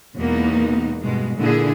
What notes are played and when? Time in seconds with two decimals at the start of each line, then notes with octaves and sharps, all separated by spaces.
0.17 E2 B2 G#3 A#3 B3 D#4
1.03 G2 B2 G#3
1.37 A#2 D3 E4 G#4